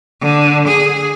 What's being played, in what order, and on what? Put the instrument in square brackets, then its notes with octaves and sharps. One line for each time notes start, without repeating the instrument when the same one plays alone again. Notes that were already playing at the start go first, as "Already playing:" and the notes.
[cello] D3
G#4